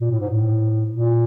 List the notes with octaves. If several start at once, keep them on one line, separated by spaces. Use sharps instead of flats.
A#2
A2
G#2
A2
A#2